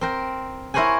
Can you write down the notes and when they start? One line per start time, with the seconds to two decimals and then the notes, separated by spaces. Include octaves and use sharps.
0.01 C4 A#4 G5
0.74 E4 A#4 C5 C#5 F#5 G#5